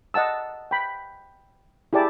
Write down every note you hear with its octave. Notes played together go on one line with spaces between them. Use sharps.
D#5 F#5 A5 E6
G5 B5
E4 G4 G#4 D5 A5